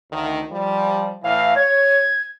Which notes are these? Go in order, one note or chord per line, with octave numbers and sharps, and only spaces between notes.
D2 D#3
F3 G3
A2 E3 F5
C#5 G#6